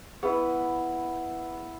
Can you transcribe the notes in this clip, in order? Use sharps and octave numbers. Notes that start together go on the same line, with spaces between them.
B3 E4 G#4 B4